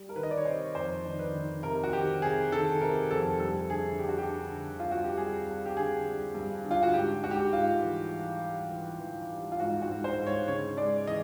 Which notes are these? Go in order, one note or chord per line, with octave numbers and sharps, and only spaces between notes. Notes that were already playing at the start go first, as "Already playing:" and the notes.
Already playing: G3
A#4
D#3 B4
D#5
D5
C#5
C3 C5
C#5
F2 C5
D#3
B4
D#3
C3 A#4
F#4
D#3 G4
C3 G#4
D#3 A4
C3 A#4
F2 A4
G2 A4
D3 G#4
G3 G4
F#4
G4
D3
D3
F4
G2 F#4
G4
G3 G#4
G3
G4
D3 G#4
G3
G2
D3
F4
F#4
G#2 G4
G#2 F#4
G4
F#4
G#2 F4
E3
E3
G3
E3
E3
G3
F4
G#2 F#4
F#4
G#2
C5
G#2
C#5
C#3 C#5
G#3 D5
E3 D#5